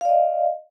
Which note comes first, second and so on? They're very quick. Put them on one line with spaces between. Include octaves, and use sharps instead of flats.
F5 D5 D#5